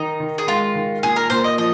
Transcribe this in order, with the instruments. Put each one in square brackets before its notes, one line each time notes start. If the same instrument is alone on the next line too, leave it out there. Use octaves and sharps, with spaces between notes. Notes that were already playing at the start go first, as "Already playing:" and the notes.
Already playing: [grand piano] D#3 [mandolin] D#4
[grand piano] D#3
[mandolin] G#4
[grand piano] G#3 [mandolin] F4
[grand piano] D#3
[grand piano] A#2 [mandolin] G#4
[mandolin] A#4
[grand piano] A#2 [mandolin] C5
[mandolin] D#5
[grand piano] F3 [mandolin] D#5